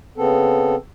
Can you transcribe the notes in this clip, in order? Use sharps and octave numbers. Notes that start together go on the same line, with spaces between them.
C#3 B3 C4 A4